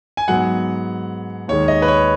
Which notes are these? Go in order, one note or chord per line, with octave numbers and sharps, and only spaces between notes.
G#5
G#2 F#3 B3 F#5
D#2 D#3 G#3 C#5
D#5
B4
C#5